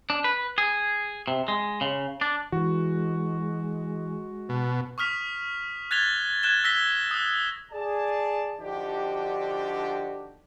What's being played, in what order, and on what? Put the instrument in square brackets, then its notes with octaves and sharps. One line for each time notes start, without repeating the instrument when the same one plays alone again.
[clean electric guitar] D4
B4
G#4
C3
G#3
C#3
D4
[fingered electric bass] E3 [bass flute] G#3 [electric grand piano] F#4
[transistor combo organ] B2
[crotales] C#6 D#6 F6 B6 F7
F#6 G#6 A6 B6 F7 G7
F#6 G#6 E7 G7
E6 A#6 B6 G7
D#6 F#6
[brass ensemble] G#4 D5 A5
D3 F3 D4 D#4 F#4 G4